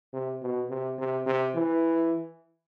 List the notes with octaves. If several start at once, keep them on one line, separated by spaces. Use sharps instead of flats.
C3
B2
C3
C3
C3
E3